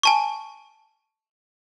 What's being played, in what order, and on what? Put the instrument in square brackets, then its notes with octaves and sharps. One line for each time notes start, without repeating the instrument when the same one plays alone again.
[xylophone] G#5 A5 C#6